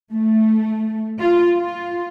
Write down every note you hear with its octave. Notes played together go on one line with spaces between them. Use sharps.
A3
F4
F4